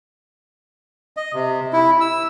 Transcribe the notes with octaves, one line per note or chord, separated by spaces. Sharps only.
D#5
C3
E4
E6